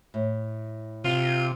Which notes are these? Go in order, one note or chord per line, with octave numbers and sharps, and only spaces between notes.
A2
C3 F4